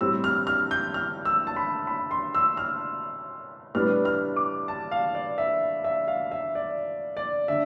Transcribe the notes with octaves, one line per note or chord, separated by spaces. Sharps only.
A2 G3 C4 E6
F6
F6
G6
F6
E6
A5
B5
B5
C6
E6
F6
A2 G3 B3 D4 F6
F6
D6
A5
F5
D5
E5
E5
F5
E5
D5
D5
D3 E5